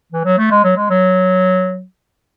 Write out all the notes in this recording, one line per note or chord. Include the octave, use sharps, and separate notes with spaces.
E3
F#3
A3
G#3
F#3
G#3
F#3